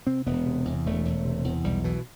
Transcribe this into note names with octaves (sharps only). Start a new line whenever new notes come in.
C3 C4
E1 B3
C3
E2
E1 A3
E1
C3
E2
B1 G3
B2 E3